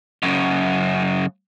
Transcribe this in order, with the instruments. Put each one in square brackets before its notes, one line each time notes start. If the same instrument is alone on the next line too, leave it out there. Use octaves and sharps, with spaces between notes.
[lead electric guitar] F#2 C#3